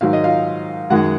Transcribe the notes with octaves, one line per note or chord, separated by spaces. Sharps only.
G#2 D#3 F#3 F5
D#5
F4 F5
F#2 D#3 G#3 F#4 F#5